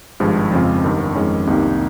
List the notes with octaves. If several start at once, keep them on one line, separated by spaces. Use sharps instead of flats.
G#1 G2 F3 G#3
F2 C#3 G#3 C4 F4
G1 G2 D#3
F2 D#3 G#3 C#4
C2 C3 D#3 A#3 D#4